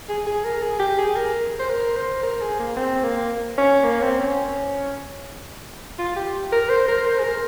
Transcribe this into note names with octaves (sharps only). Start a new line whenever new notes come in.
G#4
G#4
A#4
G#4
G4
G#4
A#4
C5
A#4
C5
A#4
G#4
A#3
C4
A#3
C#4
A#3
C4
C#4
F4
G4
A#4
C5
A#4
C5
G#4
A#4